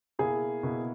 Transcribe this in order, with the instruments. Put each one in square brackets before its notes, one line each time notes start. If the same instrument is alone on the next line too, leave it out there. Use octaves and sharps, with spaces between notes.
[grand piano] B2 A#3 E4 [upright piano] G#4
[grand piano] B2 A#3 E4